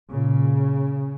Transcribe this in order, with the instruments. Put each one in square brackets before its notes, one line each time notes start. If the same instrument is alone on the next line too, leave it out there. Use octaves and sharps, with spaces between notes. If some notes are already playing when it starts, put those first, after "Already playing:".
[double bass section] A#2 C#3